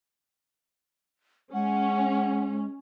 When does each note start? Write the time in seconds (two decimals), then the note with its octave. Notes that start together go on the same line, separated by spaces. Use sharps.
1.53 G#3 C#4 F#5